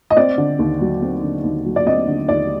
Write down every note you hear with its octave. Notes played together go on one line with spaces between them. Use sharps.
D#5
C4 D5
D3
D#2
F#3
C4
D3
D#2
F#3
D5
C4 D#5
D3
D#2 D5